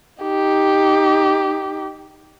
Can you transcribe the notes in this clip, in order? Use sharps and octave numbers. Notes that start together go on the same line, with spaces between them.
D#4 G4